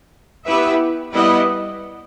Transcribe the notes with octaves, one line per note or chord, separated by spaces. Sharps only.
B3 E4 G4 B4 E5
G3 B3 E4 B4 D#5